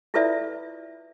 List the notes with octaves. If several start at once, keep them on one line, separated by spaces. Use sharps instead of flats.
E4 F4 A4 B4 D5 E5